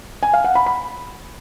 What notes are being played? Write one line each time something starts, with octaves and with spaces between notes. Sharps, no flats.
G#5
F5
F#5
B5
B5